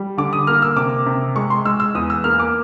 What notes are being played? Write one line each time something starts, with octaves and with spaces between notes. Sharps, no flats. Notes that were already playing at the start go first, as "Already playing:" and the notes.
Already playing: G3
D3 D6
D#6
A#3 F6
E6
C3 D6
C3
G#3 C#6
C6
G#3 E6
E6
E2 D#6
E6
A#3 F6
D6